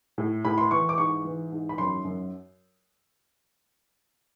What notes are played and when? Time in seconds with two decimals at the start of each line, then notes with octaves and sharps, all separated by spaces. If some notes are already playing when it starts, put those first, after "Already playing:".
0.18 A2
0.45 A2 B5
0.58 C6
0.71 E3 C#6
0.89 D6
0.98 G#2 C#6
1.25 E3
1.52 G#2
1.69 B5
1.78 F#2 C6
2.05 F#2